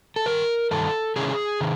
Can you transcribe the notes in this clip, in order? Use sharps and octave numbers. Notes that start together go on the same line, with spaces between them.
A4
G2 D#3 A#4
G2 D#3 A4
C3 D#3 G#3 C#4 E4 G#4
C3 D#3